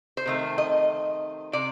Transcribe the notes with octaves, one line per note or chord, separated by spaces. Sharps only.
C5
C3 D#3 A3
D#5
C3 D5